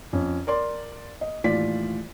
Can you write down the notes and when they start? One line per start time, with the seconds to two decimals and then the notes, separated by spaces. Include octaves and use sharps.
0.13 F2 C#4
0.47 A#4 D5 C6
1.21 D#5
1.44 D#2 A2 E3 F4 D5 B6